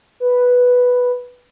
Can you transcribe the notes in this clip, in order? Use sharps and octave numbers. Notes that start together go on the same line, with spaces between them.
B4